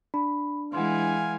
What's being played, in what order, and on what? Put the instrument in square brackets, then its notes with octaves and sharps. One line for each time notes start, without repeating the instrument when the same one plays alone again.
[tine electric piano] D4 [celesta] B5
[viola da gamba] E3 G#3 [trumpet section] F5 G#5 [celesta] F#5 C6